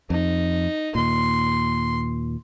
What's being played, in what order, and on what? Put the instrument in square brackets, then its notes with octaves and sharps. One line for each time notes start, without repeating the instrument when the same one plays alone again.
[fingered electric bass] F2 [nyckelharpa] D#4
[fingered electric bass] D#2 A#2 [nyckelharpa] C6